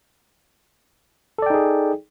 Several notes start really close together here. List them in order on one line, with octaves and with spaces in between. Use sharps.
A4 D5 G5 D#4 G#4